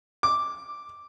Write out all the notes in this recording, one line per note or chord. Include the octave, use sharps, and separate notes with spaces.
D6